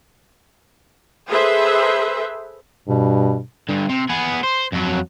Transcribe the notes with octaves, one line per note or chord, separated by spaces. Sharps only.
G#4 A4 B4 C5 E5
G2 B2
G2 D3
C3
B3 G#4
C5
F2 F#3